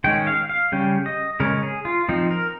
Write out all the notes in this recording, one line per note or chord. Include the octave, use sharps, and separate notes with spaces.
D#3 G#3 C#4 G5
F5
F5
C#3 G3 C#4 G5
D#5
C#3 G#3 C#4 A#4
G#4
F4
F3 C4 D#4
A#4